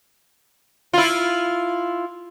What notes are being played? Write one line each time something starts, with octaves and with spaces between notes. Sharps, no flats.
E4 F4